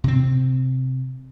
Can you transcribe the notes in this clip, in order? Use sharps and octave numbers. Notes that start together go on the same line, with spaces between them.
C3 C4